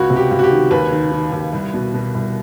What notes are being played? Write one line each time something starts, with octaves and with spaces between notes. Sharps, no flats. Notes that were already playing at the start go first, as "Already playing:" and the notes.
Already playing: C#2 F#4
C3
G4
C#2
F#4
G4
D#3
D#2 B4
D#3
D#3
D#2
C2
B2
B2
C2